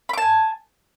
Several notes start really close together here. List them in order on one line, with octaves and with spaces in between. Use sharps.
B5 D6 A5 G#5